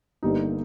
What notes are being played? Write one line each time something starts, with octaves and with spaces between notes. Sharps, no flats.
G1 G2 G3 A#3 D#4